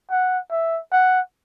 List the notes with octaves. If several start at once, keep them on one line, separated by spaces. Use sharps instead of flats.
F#5
E5
F#5